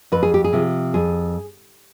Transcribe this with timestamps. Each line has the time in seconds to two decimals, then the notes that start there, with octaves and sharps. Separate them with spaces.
0.12 F2 B4
0.23 G#4
0.34 G4
0.44 G#4
0.53 C3 F3
0.94 F2 G#4